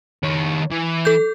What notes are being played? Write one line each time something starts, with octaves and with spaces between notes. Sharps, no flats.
D#3 C#5
E3
A4 G6